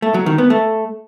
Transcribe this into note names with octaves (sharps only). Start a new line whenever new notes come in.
A3
F#3
D#3
B3
A3